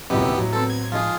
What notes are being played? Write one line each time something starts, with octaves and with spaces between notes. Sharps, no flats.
D#1 C2 F#2 C3 B3 D#4 E4 G4
A2 F#3
B3 C4 A4
G#6
F3 G#3 D#4 F4 G#4